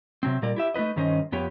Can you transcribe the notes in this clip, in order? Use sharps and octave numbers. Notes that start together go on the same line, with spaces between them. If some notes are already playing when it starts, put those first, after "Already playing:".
C3 F#3 C4
A#2 G3 A#4 D5
E4 G4 E5
A3 D#4 E4 B4 D#5
G2 D#3 C#4 C5 D#5
F2 B3 G4 C#5